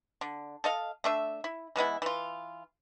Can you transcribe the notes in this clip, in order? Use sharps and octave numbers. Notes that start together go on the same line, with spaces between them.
D3
A4 D#5 F5
A3 D4 E5
E4
E3 G#3 B3 E4
E3 F4